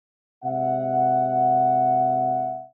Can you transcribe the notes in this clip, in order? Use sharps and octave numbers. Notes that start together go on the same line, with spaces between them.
C3 G#3 E5 F#5